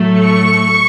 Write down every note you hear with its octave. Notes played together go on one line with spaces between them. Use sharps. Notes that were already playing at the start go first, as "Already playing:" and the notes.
Already playing: A2 F#3 A3
C#6